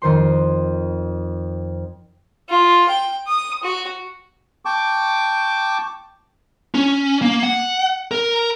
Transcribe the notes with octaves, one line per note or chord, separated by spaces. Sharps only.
F2 D#3 C5 C6
F4
G5
D#6
F#4
G5 A5 C#6 D6
C#4
A#3
F#5
A#4